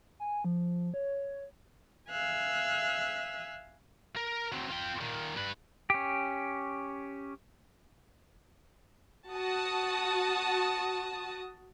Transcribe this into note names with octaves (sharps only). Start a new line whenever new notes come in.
G#5
F3
C#5
E5 F5 G#5 E6 F#6
A#4
F#3 C4
F4 G5
A#2 D#3
G2 B4
C#4 G4
F#4 A5 D#6